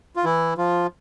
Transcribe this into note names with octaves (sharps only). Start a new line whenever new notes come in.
F4
E3 E4
F3 F4